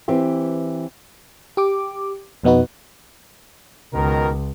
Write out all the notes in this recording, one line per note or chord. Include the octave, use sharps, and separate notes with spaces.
E3 C4 G4
G4 D6
F2 B2 B3 D#4 F#4 B4
C#2 B2 D#3 A#4